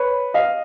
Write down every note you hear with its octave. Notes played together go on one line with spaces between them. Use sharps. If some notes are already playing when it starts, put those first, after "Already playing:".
Already playing: B4 C#5
D#5 F5